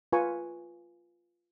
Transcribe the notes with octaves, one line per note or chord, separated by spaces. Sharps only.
F4 B4 G#5 C#6